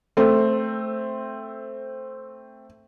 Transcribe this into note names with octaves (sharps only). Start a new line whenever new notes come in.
A3 C4